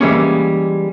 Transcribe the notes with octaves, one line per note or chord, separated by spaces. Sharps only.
E3 F3 G3 G#3 A#3 C#4